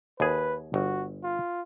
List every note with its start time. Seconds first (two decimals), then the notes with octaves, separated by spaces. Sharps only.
0.20 D#2 G#4 B4
0.74 G1 F#4
1.24 F4